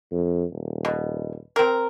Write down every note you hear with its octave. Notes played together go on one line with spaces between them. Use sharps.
F2
D#1
B2
C4 A#4